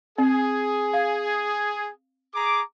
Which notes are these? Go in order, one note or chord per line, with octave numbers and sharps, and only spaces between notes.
C4 G#4
F5
G#4 A#5 D6